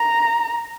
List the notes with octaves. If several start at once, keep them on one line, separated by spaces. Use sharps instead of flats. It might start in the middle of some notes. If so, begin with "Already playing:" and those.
Already playing: A#5